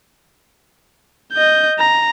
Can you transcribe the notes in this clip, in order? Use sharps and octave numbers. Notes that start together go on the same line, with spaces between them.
D#5 G6
A#5